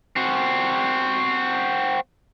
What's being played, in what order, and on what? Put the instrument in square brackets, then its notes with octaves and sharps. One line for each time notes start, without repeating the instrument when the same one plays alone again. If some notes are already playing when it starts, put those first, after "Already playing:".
[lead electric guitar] C4 F#4